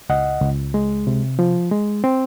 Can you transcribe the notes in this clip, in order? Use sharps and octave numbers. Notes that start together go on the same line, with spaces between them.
C#2 D#5 F#5
C#2
G#3
C3
F3
G#3
C4